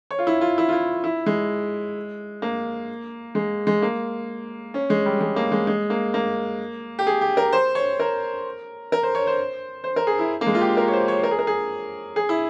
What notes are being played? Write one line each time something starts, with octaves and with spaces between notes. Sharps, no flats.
C#5
F4
E4
F4
E4
F4
E4
E4
G#3
A#3
G#3
G#3
A#3
C#4
G#3
G3
G#3
A#3
G#3
G#3
A#3
A#3
G4
G#4
G4
A#4
C5
C#5
A#4
A#4
C5
C#5
C5
C5
A#4
G#4
E4
A#3
G#3
F4
G4
A#4
C#5
C5
C#5
A#4
G#4
A#4
G#4
G#4
E4